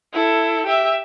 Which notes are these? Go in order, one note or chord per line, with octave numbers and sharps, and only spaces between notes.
E4 A4
G4 E5